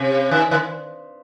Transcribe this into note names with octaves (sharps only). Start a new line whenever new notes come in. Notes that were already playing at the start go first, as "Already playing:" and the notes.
Already playing: C3
D#3
D#3